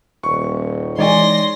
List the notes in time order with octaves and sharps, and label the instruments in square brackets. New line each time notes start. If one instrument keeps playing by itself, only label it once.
[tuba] D#1 [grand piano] C#6
[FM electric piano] E3 G#3 D#4 [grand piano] C#5 D5 G#5 [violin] C6 A#6